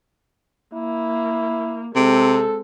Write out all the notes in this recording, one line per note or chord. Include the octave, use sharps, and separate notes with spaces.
A#3 E4
C3 G#3 C4 A4